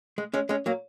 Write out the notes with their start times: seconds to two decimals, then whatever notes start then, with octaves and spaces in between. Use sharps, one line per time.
0.18 G#3
0.34 G#3 C#4
0.49 G#3 C#4
0.66 F#3 A#3